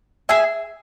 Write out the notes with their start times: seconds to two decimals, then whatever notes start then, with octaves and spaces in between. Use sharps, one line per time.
0.29 G#4 E5 G#5